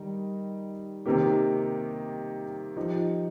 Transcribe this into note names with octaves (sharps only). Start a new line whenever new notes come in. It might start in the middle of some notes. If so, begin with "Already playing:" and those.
Already playing: D#3 G3 D#4
C3 D#3 A#3 G4
F3 D#4 G4